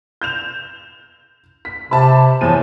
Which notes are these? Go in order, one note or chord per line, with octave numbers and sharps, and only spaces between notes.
G6 E7 F7
B6
C3 A5 B5
E2 F3 C#5 A5 D#7